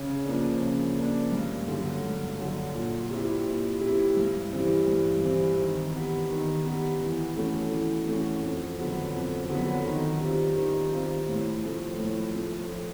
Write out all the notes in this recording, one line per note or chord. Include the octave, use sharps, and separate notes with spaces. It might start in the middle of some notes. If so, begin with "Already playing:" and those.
Already playing: C#3
F3 A#3 D4
C#3
F3 A#3 D4
G2
D3 F#3
G2
D3 F#3
A#2
G3 C4 E4 G4
A#2
G3 C4 E4 G4
G2
E3 G3 C4
G2
E3 G3 C4
D#3
G3 B3
D#3
G3 B3
E3
A3 C#4 F#4
E3
A3 C#4 F#4
F2
D3 F#3 B3
F2
D3 F#3 B3
D#3
G3 C4 F4
D#3
G3 C4 F4
A2
F3 A3
A2
F3 A3
F3